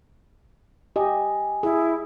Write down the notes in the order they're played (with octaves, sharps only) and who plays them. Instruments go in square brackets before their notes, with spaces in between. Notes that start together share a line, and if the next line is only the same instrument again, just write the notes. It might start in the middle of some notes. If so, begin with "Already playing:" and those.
[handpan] G4 D#5 [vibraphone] G#5
[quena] E4 [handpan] G#4